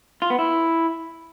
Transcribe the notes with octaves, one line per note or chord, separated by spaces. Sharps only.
F4
B3
E4